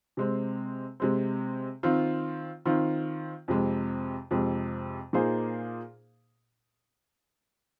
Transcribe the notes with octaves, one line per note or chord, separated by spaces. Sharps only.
C3 G#3 C4
C3 G#3 C4
D#3 C4 F4
D#3 C4 F4
F2 C3 G#3
F2 C3 G#3
A#2 A#3 D#4 G#4 C5